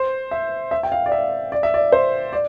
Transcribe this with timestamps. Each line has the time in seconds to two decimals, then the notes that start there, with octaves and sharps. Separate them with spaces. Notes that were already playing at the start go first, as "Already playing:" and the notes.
Already playing: C5
0.31 E5
0.71 E5
0.83 G5
0.92 F5
1.06 D5
1.12 E5
1.52 D5
1.63 E5
1.74 D5
1.92 C5
2.33 D5